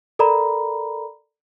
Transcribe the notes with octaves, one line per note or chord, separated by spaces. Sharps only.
A4 A#4 D5 A#5 B5